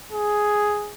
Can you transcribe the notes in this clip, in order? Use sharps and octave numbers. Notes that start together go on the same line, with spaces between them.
G#4